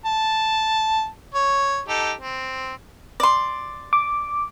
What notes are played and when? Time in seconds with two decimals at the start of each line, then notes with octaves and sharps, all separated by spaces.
0.06 A5
1.34 C#5
1.88 D#4 G4 A4
2.21 C4
3.20 D5 C6
3.93 D6